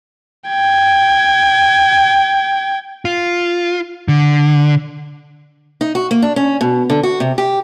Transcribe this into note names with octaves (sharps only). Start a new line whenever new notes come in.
G5 G#6
F4
D3
D#4
F#4
A#3
D4
C#4
B2
D3
F#4
C3
G4